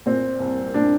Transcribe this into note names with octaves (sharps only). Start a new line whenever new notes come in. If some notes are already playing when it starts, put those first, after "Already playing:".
A#2 C4
C2
A#2 D4